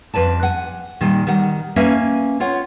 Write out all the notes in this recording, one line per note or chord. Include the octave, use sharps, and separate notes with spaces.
F2 B4 D5 A5
F#5 G#5
A#2 D#3 G3
D#3 G3 F#5
A#3 C#4 B4 E5 G#5
F4 C#5 F#5